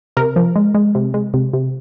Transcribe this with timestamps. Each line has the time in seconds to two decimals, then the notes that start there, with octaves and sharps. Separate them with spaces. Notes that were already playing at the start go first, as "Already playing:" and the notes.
0.17 C3 A#4
0.36 F3
0.56 G#3
0.75 G#3
0.95 C3
1.14 G#3
1.34 C3
1.53 C3